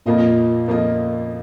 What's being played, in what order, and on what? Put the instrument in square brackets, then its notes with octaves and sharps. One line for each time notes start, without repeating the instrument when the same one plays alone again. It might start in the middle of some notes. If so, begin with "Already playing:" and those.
[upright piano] F2 F3 A#3 F4 D#5 [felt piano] A#2
[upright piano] F2 F3 A#3 F4 D#5